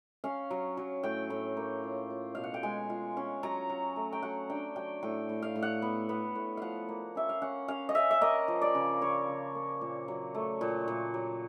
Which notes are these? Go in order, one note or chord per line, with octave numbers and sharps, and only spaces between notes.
C#4 F5
F#3
F#3
A2 G5
A2
A#3
F4
F4
B2 F5
F#5
G5
G#3 G#5
F4
C#4
F#3 A#5
F#3
A3
G5
F#3 F#5
D4 G5
F#3 G5
A2 G5
A2
F5
A2
F#5
B3
B3
A2
F3 F5 F#5
A#3
C#4 E5
F5
C#4 F#5
C#4 F5
D#5
C#4 E5
E5
A#3 D#5
F3
D5
C#3
C#3 C#5
C#3
A#3
A#2
F#3
A3
A#2
A#2
F#3